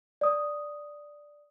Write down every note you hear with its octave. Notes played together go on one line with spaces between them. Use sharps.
D5 D#6